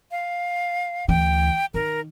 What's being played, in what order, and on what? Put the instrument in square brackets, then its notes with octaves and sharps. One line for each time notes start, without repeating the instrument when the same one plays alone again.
[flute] F5
[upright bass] D2 E3 [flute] G5
[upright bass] D#3 [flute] A#4